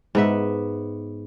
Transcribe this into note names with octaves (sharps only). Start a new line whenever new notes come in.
G#2 B3 E5